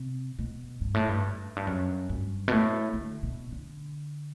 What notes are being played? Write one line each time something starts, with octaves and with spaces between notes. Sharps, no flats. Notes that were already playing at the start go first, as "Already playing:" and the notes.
Already playing: C3
B2
G2
A2
G2
F#2
G2
F#2
G2
B2
A2
D3
B2
D3